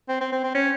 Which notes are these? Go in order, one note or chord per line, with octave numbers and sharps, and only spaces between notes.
C4
C4
C4
C4
C#4